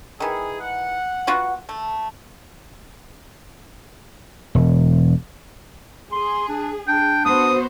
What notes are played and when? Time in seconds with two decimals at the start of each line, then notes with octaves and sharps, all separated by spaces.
0.20 D#3 E3 G#4
0.61 F#5
1.27 B3 F4 F#4
1.69 A3
4.55 E1
6.12 G#4 C6
6.49 D4
6.88 D4 G5
7.25 B3 F#4 C5 D#6